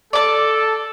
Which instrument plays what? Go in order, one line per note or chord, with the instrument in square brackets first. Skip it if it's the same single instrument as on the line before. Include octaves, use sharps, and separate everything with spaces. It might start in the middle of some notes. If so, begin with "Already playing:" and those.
[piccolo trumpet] A4 [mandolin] D5 A5